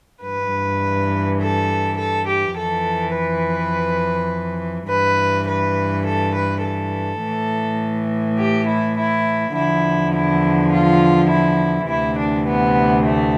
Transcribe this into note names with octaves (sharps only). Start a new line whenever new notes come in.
G2 E3 B4
A4
A4
G4
F2 E3 A4
B4
G2 E3 B4
B4
A4
B4
A4
A2
E3
G4
E4
E4
E2 D3 F3 E4
E4
F4
E4
D2 C3 E3 E4
D4
B3
A3